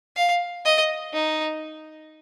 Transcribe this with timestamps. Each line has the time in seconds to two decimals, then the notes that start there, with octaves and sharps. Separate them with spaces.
0.16 F5
0.65 D#5
1.13 D#4